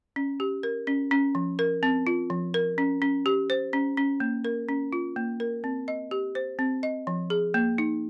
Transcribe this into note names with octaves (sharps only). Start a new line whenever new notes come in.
C#4
G4
A#4
C#4
C#4
F3
A#4
C4
F4
F3
A#4
C#4
C#4
G4
C5
C#4
C#4
A#3
A#4
C#4
F4
A#3
A#4
C4
D#5
G4
C5
C4
D#5
F3
G#4
A#3
D#4